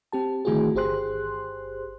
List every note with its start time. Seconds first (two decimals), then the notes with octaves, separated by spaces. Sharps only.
0.12 C4 G4 A5
0.45 D3 D#3 A3 E4 F#4 G#4
0.75 G1 G4 G#4 C5 C6 F#6